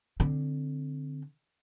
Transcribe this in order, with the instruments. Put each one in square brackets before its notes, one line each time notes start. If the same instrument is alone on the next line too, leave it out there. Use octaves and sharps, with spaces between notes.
[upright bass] D3 C4